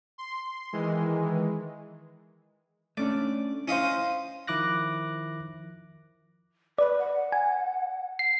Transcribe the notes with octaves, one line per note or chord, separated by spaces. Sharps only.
C6
D#3 E3 G#3
A3 C#4 D4 D5
C#4 E4 C5 D#5 F5
D#3 F3 E4 D6 F#6 A#6
B4 D5
F#5
G#5
C7